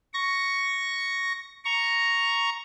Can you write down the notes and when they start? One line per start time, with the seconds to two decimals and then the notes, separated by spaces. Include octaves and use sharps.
0.14 C#6 A#6
1.65 A#5 C#6